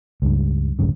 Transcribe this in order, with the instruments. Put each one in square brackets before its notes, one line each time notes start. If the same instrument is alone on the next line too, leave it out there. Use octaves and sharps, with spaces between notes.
[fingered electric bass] C#2 G2
A1 D2 G2 C#3